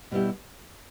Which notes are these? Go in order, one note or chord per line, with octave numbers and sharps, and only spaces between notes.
B2 G3 B3 E4 G4